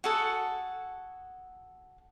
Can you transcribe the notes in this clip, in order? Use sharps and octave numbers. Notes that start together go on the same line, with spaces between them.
F#4 G#4 A4 F#5